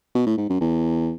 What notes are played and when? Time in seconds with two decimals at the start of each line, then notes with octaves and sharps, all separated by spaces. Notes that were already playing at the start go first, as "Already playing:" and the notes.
0.15 B2
0.26 A2
0.37 G#2
0.50 F#2
0.61 E2